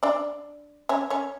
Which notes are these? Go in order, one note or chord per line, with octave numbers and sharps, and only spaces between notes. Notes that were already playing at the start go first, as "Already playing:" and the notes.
D4 D5
C#4 C#5
C#4 C#5